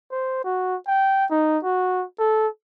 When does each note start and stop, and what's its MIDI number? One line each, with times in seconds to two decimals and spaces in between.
0.12 0.43 72
0.44 0.75 66
0.87 1.25 79
1.31 1.58 63
1.64 2.04 66
2.19 2.47 69